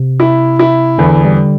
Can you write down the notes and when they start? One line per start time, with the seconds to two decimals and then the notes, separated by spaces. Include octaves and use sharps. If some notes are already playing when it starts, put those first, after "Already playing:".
Already playing: C3
0.20 E4
0.59 E4
0.98 E2 D3
1.25 G3